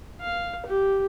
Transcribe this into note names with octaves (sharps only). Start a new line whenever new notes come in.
F5
G4